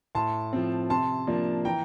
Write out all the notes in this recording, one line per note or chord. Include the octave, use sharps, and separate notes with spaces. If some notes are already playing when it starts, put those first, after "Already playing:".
A2 A5 C6
F3 C4
C3 A5 C6
F3 A#3 D4
E3 G5 A#5